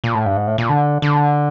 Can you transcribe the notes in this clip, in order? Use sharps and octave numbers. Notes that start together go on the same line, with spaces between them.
A#2
A2
G2
G#2
A2
A#2
D3
D3